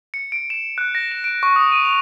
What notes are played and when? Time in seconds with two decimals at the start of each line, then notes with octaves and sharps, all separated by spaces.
0.14 C#7
0.32 D7
0.50 E7
0.78 F#6
0.95 A#6
1.12 E7
1.24 D7
1.43 C#6
1.56 D#6
1.72 D#7
1.84 F7